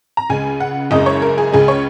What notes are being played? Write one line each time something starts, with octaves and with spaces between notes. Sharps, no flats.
A#5
C#2 C#3 G#3 G#5
F#5
F#1 F#2 C#3 G#3 D#5
C#5
A#4
G#4
C#2 C#3 G#3 G#4
C#5